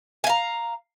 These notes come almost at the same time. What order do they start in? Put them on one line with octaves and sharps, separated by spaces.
G#5 F5 A#5